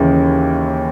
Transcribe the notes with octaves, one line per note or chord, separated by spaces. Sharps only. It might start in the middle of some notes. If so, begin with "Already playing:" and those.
Already playing: D#2 C#3 E3